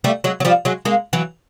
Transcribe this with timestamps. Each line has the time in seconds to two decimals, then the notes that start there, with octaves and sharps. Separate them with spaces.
0.04 G3 A3
0.24 F#3 G#3
0.40 F#3
0.45 F3 G3
0.65 F#3 G#3
0.85 G#3 A#3
1.13 E3 F#3